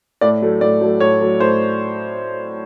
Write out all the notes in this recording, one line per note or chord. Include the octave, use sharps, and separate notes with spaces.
A2 D5
F#3 A3
A2 D5
F#3 A3
A2 C#5
F#3 A3
A2 C5